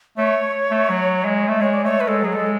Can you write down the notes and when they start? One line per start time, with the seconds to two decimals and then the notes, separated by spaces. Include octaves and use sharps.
0.17 A3 C#5
0.71 A3
0.90 F#3
1.25 G#3
1.49 A3
1.61 G#3 C#5
1.74 D5
1.85 A3 C#5
2.00 B4
2.08 G#3 A4
2.22 F#3 G#4
2.32 G#3 A4